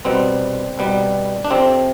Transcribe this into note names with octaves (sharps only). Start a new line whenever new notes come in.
C2 B2 G3 B3 C4
C2 B2 G3 B3
D4
F2 C3 F3 C4